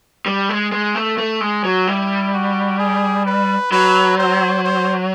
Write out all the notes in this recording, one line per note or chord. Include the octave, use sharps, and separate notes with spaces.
G3
G#3
G#3
A3
A3
G#3
F#3
G3 E4
F#4
G#4
B4
F#3 B4
C5
C5